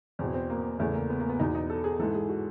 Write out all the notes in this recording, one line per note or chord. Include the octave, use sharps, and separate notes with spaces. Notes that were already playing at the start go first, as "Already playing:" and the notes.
E2 B2 C4
C4
A#3
E2 C#3 E3 A3
A#3
B3
A#3
B3
E2 B2 D#4
D#4
A4
G#4
G#2 E3 A4
G#4
F#4